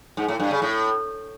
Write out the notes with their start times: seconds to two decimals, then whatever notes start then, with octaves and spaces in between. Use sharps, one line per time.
0.17 G#2
0.28 A2
0.40 G2
0.51 C#3
0.62 A2